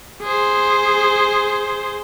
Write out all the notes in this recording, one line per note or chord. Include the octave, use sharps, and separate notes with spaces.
G#4 C5